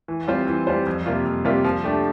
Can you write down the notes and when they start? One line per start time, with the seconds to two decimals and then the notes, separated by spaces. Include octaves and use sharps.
0.08 E3
0.28 G3 C4 F4 C5
0.47 E3
0.67 G3 C4 F4 C5
0.87 F2
1.06 C3 G3 A#3 F4
1.25 F2
1.45 C3 G3 A#3 F4
1.64 F3
1.84 A3 D4 G4